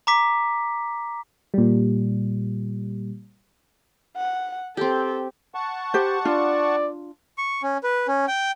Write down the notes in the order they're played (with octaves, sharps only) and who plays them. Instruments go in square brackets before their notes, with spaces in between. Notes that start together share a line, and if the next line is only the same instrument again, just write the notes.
[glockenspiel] A#5 D6 B6
[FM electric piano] A#2 G3
[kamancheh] F#5
[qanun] C4 G4 [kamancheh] A4 G5
[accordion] F#5 A5 C#6
[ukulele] G4 C5
[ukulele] D4 F4 [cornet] D5
[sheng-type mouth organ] C#6
C#4
B4
C#4
G5